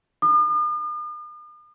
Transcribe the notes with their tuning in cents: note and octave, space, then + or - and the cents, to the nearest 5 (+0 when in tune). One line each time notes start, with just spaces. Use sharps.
D#6 -45